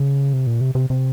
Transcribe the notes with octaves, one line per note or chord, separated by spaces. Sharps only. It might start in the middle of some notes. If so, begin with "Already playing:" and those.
Already playing: C#3
C3
A#2
C3
C3
C3